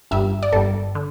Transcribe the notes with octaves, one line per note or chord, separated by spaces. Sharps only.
G1 G2 G3 E5
D5
G1 G2 G3 A4
D3